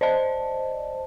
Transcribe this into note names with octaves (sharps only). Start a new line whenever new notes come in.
C5 D5 D#5 A5